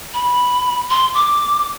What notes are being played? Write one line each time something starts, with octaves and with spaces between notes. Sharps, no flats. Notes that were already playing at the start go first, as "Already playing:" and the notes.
B5
C6
D6